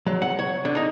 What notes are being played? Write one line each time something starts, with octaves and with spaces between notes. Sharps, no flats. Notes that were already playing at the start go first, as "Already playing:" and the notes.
F#3
F#5
C#5
D3
D#4